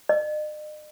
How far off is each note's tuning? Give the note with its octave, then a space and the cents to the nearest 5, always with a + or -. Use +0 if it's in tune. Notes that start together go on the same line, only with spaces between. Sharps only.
D#5 -45